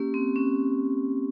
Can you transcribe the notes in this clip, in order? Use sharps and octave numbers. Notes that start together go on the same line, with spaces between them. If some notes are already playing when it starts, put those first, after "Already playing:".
Already playing: A#3 C#4 G4
C4
C#4